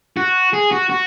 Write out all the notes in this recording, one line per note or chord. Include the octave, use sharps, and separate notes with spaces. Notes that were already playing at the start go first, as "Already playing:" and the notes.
F#4
G#4
F#4
F#4